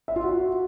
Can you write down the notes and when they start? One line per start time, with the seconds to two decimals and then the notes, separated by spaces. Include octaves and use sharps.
0.08 E5
0.16 F4
0.24 F#4